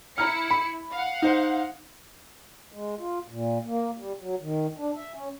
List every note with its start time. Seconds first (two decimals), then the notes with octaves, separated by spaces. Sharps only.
0.18 E4 A#5 F6 C#7
0.50 B5
0.91 F5 F#5
1.22 D#4 C5
2.72 G#3
2.99 F4
3.28 A#2
3.67 A#3
3.98 G3
4.20 F#3
4.41 D#3
4.78 D4
4.96 E5
5.14 C#4